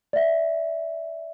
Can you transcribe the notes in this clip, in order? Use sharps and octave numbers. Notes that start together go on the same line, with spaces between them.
D5 E5